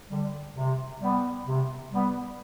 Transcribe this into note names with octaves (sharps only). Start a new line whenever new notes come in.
D3 G3
C3
G3 B3
C3
G3 B3